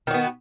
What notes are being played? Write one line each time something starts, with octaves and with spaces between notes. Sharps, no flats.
D#3 B3 F#4